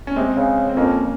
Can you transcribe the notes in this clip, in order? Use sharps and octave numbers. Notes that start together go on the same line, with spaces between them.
C#4
C3 G#3 C4
C#3
C4
F2 A#3 C#4